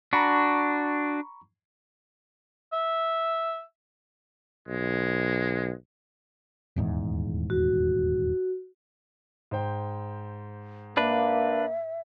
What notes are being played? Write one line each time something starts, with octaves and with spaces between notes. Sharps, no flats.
D4 F#4 A#5 B5 C#6
E5
B1 G#3
D#1 E2 G#2
F#4
G#2 C5 G5
A#3 D4 B4 E5